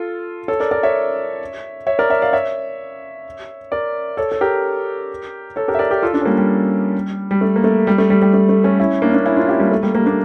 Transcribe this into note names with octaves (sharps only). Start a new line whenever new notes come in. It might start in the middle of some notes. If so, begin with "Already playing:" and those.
Already playing: F4 A4
A4 C#5
A#4 D5
A#4 D5
C#5 E5
C#5 E5
A#4 D5
C#5 E5
D5 F5
C#5 E5
A#4 D5
A4 C#5
A4
G4 A#4
A4 C#5
G4 A#4
E5
A#4 D5
G4 A#4
F4 A4
D4 F4
C#4
G3 A#3
G3
G3
A3
A#3
A3
G3
A3
G3
G3
A3
A3
A3 C#4
C#4 E4
A#3 D4
C#4
A#3 D4
C#4 E4
D4 F4
E4 G4
G3 A#3
A3
G3 A#3
G3 A#3
A#3 D4